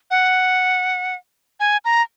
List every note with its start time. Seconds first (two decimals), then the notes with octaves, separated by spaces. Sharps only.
0.11 F#5
1.60 G#5
1.85 A#5